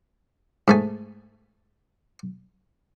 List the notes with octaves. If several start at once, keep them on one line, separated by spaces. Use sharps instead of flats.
G#2 A3 G#5